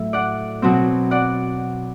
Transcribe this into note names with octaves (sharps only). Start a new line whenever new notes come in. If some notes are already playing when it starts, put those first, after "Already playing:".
Already playing: A2 F#3 E5
D5 F#5
B2 F#3 C4
D5 F#5